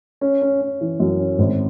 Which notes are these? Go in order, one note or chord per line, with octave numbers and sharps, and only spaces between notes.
C#4
C#4
C#4
E3
F#2
C#4
G#1